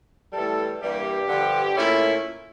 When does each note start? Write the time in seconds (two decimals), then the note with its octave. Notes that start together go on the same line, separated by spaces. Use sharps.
0.33 A2 E3 G3 A4
0.81 G2 E3 G3 A#3 G4
1.29 G2 D3 F3
1.76 A#2 A3 C#4 E4